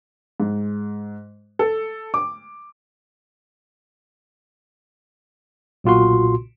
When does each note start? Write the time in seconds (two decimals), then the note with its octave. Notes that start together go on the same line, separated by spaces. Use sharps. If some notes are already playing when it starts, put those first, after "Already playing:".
0.40 G#2
1.59 A4
2.14 D6
5.84 B1 A#2 F4 F#4 C6